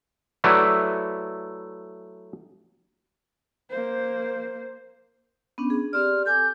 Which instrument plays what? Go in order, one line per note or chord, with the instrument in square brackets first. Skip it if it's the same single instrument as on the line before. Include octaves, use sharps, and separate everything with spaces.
[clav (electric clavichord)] F#3 A3 E4 B4 D5 E5
[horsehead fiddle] A#3 C5
[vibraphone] B3 C#4 D4
G#4
[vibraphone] C4 G4 D5 [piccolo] F6
[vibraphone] A4 G#5 D6 [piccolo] G6